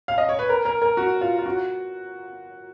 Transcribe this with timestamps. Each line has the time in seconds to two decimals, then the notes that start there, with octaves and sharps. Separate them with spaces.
0.08 F5
0.18 D#5
0.29 C#5
0.39 B4
0.49 A#4
0.65 A#4
0.82 A#4
0.97 F#4
1.21 F4
1.38 F4
1.46 F#4